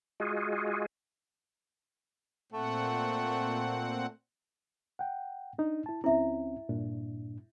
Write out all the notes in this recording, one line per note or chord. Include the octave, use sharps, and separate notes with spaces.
G#3 F4 F#4 G#4
A#2 A3 C4 F#5
F#5 G5
D4 D#4
E4 A5
C#2 C4 C#4 E4 E5
G2 A#2 D4